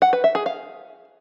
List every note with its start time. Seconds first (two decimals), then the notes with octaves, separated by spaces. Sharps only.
0.02 F#5
0.13 B4
0.24 E5
0.35 G#4
0.46 F5